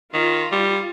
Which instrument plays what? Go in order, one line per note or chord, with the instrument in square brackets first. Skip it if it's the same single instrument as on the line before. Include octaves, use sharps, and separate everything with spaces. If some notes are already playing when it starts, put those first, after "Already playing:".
[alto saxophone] D#3 [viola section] F4
[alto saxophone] G3